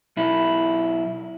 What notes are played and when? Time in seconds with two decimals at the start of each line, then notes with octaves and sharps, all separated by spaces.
0.17 B1 E4